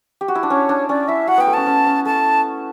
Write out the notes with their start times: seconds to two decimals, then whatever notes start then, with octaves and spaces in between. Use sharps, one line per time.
0.21 G4
0.28 F#4
0.35 E4
0.43 D4
0.50 C#4 C#5
0.69 D4
0.89 C#4 D5
1.08 E4 E5
1.28 F#4 F#5
1.38 B3 G5
1.47 A3
1.54 C#4 A5
1.67 C#4
1.86 C#4
2.06 A3 A5